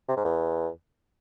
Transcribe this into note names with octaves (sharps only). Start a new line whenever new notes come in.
C3
G#2
E2